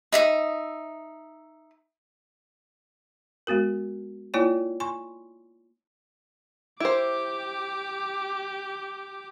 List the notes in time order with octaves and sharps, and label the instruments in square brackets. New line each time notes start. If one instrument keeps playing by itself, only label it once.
[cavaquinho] D#4 E5 D#6
[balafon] G#3 B3 F#4 A#4
A#3 E4 F4 C#5 D5 G#5
G#5 C6 C#6
[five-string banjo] E4 C5 [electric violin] G4 D6